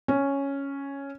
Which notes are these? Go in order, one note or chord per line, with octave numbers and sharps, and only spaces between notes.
C#4